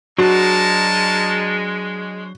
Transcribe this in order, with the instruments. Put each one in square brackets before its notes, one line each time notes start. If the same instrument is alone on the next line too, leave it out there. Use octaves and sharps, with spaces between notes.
[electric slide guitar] F#3 D4 C5 [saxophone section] G#3 [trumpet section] D#4 A#4 A5 [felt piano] F#4